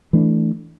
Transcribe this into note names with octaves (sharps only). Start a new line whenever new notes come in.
E3 A3 D4